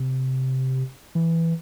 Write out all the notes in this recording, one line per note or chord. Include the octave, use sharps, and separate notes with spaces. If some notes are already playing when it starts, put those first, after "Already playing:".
Already playing: C3
E3